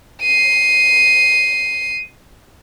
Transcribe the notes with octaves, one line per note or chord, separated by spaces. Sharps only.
C7 D#7